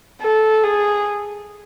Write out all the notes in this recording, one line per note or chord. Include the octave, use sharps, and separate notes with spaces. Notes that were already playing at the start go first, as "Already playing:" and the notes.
A4
G#4